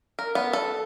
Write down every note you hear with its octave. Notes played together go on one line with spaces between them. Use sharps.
A#4
B3
A4